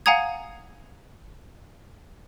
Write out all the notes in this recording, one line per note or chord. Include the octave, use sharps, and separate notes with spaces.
F5 F#5 G#5 A#5 D#6 G#6